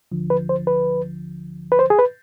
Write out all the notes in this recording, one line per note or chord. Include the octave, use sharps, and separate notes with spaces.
D2 D3 F3
B4
C5
B4
B4
C5
G#4
B4